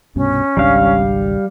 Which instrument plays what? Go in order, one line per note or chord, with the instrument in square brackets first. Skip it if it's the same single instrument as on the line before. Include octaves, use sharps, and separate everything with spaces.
[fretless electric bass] C2 G2 B2 [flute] C#4
[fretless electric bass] G#1 C#2 D4 [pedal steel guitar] G3 F5